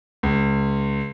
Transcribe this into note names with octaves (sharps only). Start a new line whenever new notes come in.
C#2